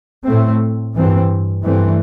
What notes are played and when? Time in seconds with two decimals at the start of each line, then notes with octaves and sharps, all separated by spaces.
0.24 A2 A3 C4
0.95 G2 E3 C4
1.64 G2 E3 A3 C4